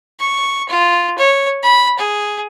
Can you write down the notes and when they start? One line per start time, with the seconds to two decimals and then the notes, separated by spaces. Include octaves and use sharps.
0.19 C#6
0.69 F4
1.18 C#5
1.63 B5
1.99 G#4